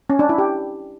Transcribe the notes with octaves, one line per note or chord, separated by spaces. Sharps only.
C#4
D4
E4
G4